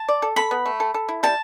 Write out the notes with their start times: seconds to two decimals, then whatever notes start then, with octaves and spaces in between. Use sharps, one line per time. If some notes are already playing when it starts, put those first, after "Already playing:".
Already playing: A5
0.08 D5
0.22 A4
0.36 A4 B5
0.51 B3
0.66 A3
0.80 A4
0.94 A4
1.08 E4
1.23 G3 A5